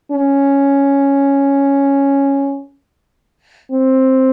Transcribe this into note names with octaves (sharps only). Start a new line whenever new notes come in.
C#4
C4